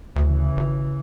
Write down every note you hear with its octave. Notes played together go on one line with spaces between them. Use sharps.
D2 C#3 E3
G#1